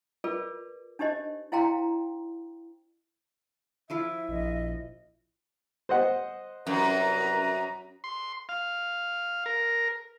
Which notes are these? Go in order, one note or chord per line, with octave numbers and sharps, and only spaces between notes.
F4 G#4 A#4 B4 D5
D4 D#4 G4 C5 D#5
E4 C5 F5 G5 A#5 C6
F3 E4 F4 E5
A#1 D#5
C5 D#5 F#5
C2 F#2 B4 A#5
C6
F5
A#4